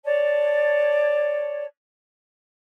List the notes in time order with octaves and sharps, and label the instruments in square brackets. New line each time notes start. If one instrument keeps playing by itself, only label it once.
[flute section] C#5 D5 A5